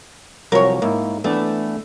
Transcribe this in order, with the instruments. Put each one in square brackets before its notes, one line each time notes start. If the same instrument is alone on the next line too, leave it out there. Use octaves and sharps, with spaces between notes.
[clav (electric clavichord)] C2 F3 F#3 [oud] A#4 C#5
[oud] G#2 [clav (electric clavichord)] A#3 E4
[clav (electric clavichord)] E3 B3 D4 [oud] A3